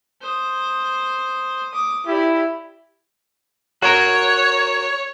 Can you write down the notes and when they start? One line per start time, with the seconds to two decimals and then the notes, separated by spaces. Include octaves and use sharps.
0.21 C5 D#6
1.72 D6 D#6
2.07 E4 G4 D5
3.82 F#4 A#4 C#5